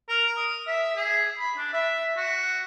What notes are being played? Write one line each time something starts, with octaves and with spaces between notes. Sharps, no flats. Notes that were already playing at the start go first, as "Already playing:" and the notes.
A#4
D#6
E5
G#4
B5
D4
E5
F#4